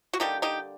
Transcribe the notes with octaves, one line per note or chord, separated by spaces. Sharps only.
F#4
D3 G3 A#3 D#4 G4
D#4 G4